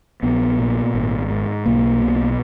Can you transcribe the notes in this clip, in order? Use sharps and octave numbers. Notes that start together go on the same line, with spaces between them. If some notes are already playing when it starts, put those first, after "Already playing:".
A#1 B3
A#2
G#1
G#2
B1 A#3
B2